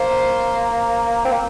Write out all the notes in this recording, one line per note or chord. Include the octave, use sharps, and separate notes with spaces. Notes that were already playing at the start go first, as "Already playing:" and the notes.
Already playing: A#3 C5
C4
A#3